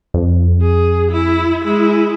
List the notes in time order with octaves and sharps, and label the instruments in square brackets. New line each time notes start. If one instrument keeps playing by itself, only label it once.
[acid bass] F2
[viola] G#4
E4
G#3 E4